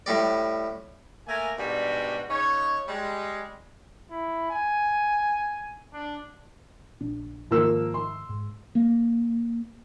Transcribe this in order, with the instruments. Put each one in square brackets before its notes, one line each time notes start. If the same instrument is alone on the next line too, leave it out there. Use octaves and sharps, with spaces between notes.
[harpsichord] A2 G3 D5
[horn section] A3 A#3 A#4 G#5
G#2 B2 G3 D4 F#4
C#3 D#4 C#5
G3 G#3
[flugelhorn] E4
G#5
D4
[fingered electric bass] A#1 D4
[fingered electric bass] G#2 D#3 [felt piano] F3 A#3 E6
[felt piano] C6
[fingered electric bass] G#2
[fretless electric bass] A#3